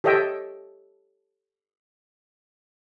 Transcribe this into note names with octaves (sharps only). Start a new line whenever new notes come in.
G4 A4 C#5 D#5 E5 G5